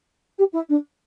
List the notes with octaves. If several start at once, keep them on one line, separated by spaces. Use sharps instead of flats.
G4
E4
D4